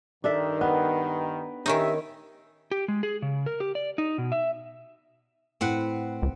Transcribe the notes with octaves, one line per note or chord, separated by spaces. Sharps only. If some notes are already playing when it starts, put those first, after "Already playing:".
G2 D#3 D4 A4 E5
B3 B4
D#3 C#4 D#4 G4 E5
G4
G#3
G#4
C#3
A#4
G4
D5
D#4
B2
E5
A2 C4 B4 F#5
C#2